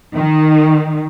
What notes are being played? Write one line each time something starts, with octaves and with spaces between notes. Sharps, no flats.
D#3